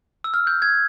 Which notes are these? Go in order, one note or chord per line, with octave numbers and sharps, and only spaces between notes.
E6
F6
G6
G#6